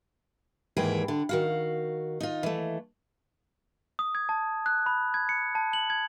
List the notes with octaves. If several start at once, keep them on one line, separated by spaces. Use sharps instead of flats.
D#2 G#2 E3 G#4 G5
D3
D#3 F#4 F5
D#4 F4
E3 A3
D#6
G#6
A5
F#6
B5
G#6
C#7
A5
F#7
G#6